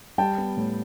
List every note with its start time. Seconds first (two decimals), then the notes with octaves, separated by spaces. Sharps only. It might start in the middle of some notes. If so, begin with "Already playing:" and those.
0.18 G3 G5 A5
0.38 B3
0.57 A2